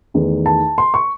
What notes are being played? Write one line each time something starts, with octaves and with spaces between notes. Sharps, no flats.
E2 D#3 A3 D#4
A5
C6
C#6